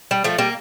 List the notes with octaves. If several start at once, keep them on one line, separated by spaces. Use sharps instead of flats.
G3
F3 A3
G3 A#3